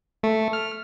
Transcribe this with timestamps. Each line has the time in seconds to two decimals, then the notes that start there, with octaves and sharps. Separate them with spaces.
0.23 A3
0.53 F6